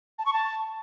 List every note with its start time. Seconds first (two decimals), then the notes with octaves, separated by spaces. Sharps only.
0.19 A5
0.26 C#6
0.33 A5